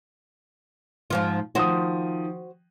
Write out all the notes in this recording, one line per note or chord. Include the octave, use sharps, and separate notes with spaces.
G#2 F3 F4
D#3 F3 F#4 C5 D#6